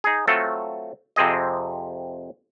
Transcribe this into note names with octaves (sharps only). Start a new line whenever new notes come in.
D#4 G#4
F#3 A3 C4 F4 A4
F2 C3 C4 G#4 D#5